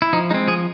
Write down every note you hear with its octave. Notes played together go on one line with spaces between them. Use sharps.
E4
F3 D#4
G#3 C4 D#4
F3 G#4